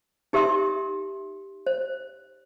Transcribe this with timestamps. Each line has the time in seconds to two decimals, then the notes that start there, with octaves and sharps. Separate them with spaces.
0.33 D#4 G4 A#4 E5 C6 D#6
1.67 C5